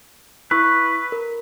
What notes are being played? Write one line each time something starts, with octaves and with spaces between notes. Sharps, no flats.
E4 B4 C#6 E6
A#4